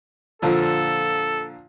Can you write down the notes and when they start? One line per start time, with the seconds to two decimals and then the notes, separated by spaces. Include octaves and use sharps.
0.42 A#2 D3 F3 A4